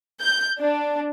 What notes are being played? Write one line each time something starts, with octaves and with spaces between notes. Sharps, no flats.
G6
D4